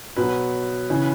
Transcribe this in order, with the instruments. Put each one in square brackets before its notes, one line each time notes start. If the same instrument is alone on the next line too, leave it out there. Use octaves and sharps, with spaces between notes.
[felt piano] B2 F#3 B4
C#3 E3